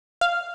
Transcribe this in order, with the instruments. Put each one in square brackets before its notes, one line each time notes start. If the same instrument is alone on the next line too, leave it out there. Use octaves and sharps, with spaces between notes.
[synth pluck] F5